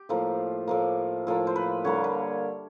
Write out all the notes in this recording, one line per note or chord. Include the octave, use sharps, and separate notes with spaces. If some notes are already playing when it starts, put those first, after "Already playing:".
Already playing: G4
A2 F3 A#3
A2 F3 A#3
A2 F3 A#3
C5
B4
D3 G3 A#3 C#5
B4